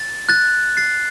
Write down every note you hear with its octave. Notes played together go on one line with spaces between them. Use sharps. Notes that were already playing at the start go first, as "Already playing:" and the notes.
Already playing: A6
F#6 A6
A6 C7